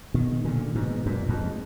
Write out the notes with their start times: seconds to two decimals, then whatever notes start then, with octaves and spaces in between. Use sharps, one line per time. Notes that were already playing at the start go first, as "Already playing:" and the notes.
0.14 B2 D#3
0.44 A#2 D3
0.75 G#2 B2
1.06 F#2 A#2
1.29 F2 G#2